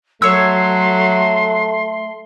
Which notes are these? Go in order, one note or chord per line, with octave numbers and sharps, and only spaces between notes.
F#3 A3 C#5 C6 E6